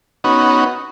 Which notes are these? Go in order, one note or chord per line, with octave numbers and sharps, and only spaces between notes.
B3 C#4 D#4 F#4